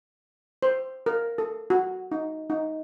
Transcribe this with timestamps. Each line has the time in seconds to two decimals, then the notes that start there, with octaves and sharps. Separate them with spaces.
0.63 C5
1.06 A#4
1.38 A4
1.70 F#4
2.12 D#4
2.50 D#4